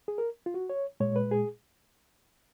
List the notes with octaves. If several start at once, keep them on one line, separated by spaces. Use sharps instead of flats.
G#4
A#4
F4
F#4
C#5
A#2 G#3 C#5
B4
G#4